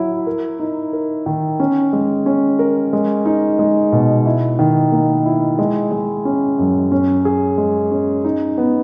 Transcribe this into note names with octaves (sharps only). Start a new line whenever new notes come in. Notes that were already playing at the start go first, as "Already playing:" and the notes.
Already playing: F#3 E4
A#4
D#4
A#4
D#3
C#4
G#3
C#4
A#4
G#3
D#4
G#3
B2
E4
D#3
A#3
E4
G#3
G#3
C#4
F#2
C#4
G#4
G#3
C#4
D#4
B3